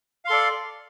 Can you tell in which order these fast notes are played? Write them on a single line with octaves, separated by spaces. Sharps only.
F5 C6 A4 D5